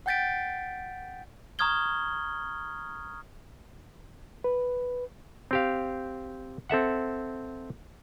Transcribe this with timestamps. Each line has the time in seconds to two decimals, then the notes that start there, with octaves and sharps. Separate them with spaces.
0.06 F#5 G5 G6 A6 B6 D7
1.59 A#5 C#6 D#6 F6 G#6 G7
4.44 B4
5.51 C4 G4 F5
6.70 C4 A4 E5 F#5